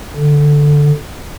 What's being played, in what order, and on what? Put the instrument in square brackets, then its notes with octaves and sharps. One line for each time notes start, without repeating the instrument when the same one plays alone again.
[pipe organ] D3